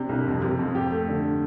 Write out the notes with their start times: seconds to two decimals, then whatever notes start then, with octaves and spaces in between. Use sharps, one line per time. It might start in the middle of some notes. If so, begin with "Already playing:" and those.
Already playing: C3 D4
0.09 C2
0.26 F2
0.42 C3
0.59 F2
0.75 G4
0.91 A3
1.08 D3